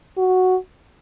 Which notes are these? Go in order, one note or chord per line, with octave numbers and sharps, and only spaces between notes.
F#4